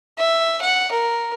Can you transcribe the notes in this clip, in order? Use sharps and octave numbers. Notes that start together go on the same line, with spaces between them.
E5
F#5
A#4